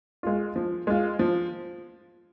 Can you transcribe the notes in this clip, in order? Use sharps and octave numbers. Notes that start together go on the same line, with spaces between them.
G#3 F4
F3
G#3 F4
F3